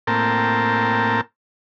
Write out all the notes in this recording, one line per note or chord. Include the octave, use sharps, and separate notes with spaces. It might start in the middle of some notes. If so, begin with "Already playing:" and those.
A2 A#3 C4 A#4 G5 A5